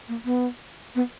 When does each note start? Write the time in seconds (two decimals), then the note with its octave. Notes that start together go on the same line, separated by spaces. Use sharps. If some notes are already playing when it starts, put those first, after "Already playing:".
0.08 A#3
0.25 B3
0.95 B3